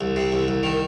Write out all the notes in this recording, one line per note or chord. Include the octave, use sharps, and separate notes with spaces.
C2
C3
C2
C2
D#3